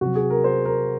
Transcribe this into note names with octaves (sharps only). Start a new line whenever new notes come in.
C3 F#3 F#4
G#4
A#4
C5
A#4